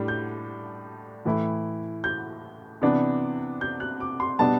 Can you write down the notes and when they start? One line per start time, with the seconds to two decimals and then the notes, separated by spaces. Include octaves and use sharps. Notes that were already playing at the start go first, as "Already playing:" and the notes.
Already playing: A2 G3 D4
0.08 G6
1.25 A2 E3 A3 E4
2.04 G6
2.82 C3 E3 B3 D4
3.61 G6
3.80 F#6
4.00 D6
4.20 C6
4.39 B2 G3 B3 D4 A5